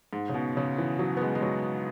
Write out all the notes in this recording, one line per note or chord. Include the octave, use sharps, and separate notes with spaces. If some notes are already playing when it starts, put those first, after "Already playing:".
G#2
C#3
B2
C#3
E3
F#3
B3
G#3
G#3
F#3